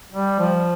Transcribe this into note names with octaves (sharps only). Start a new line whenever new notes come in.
G3
F3